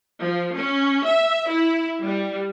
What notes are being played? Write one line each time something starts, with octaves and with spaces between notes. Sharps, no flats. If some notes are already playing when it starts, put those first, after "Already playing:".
F3
C#4
E5
E4
G3